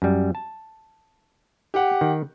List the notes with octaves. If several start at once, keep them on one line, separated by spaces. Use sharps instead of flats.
F#2 G3
A5
G4 F#5
D#3